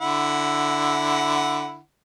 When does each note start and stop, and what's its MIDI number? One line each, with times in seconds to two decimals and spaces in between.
0.01 1.79 50
0.01 1.79 64
0.01 1.79 78